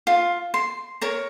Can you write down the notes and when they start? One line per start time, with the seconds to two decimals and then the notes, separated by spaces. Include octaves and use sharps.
0.07 F4
0.54 C6
1.01 A#4 C#5 A#5